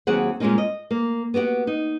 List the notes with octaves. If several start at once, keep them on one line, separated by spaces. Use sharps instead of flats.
D#2 F#3 C4 G#4 F#5
A#2 G3 G#3 A#3 C#4 D#4
D#5
A#3
B3 F#4 G4 F#5
D#4